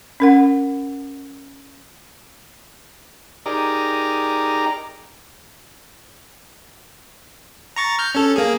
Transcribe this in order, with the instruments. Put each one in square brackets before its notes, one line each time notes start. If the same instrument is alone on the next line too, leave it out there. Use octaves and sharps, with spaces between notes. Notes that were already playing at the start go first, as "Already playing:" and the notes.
[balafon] C#4 A#4 F#5
[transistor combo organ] D#4 G4 G#4 A#4 D5 A#5
[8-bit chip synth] A#5 C#6 A6
F6 G6
C#4 A4
A#3 G#4